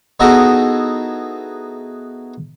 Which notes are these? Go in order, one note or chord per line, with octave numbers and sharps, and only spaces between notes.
B3 D#4 E4 F#4 G#4 A4